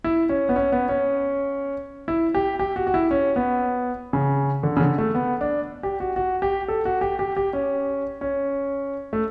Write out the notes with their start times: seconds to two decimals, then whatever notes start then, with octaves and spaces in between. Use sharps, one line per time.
0.04 E4
0.29 C#4
0.49 B3
0.56 C#4
0.72 B3
0.89 C#4
2.08 E4
2.35 G4
2.59 G4
2.76 F#4
2.87 F#4
2.94 E4
3.11 C#4
3.36 B3
4.13 C#3
4.63 D3
4.77 C#3
4.81 D3
4.98 A3
5.15 B3
5.41 D4
5.83 G4
6.00 F#4
6.16 F#4
6.42 G4
6.68 A4
6.85 F#4
7.01 G4
7.19 G4
7.37 G4
7.53 C#4
8.21 C#4
9.13 A3